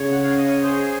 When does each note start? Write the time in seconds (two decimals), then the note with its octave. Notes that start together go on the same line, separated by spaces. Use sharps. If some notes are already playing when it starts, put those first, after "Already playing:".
Already playing: C#3 C#5
0.12 F#5
0.24 F5
0.37 D#5
0.50 C#5
0.63 G#4 C5